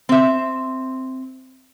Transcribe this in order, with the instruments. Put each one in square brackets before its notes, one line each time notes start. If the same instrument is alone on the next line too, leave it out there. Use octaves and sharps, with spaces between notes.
[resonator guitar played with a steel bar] C4 E5